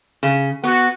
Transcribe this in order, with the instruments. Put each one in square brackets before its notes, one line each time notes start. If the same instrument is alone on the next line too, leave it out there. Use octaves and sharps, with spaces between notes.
[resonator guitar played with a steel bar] C#3
[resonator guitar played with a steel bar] B3 [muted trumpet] F#4